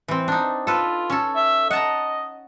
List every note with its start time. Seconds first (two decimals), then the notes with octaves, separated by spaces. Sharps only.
0.08 E3 C4
0.28 D4 D#4
0.67 F4 A4 B4
1.10 C#4 A4
1.36 E5
1.71 D#5 F#5 A5 A#5